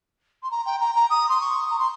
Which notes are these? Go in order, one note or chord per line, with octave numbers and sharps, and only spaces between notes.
C6
A#5
G5
A#5
A#5
D#6
C6
C#6
A#5
C6